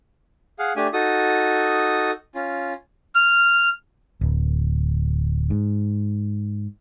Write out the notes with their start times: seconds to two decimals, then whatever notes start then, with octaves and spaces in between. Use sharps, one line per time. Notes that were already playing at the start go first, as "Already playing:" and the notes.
0.59 G#4 F5 F#5
0.76 A3 D4 G4 G#5
0.93 D#4 F#4 A4 D#6
2.35 C#4 F4
3.15 F6
4.21 D1
5.50 G#2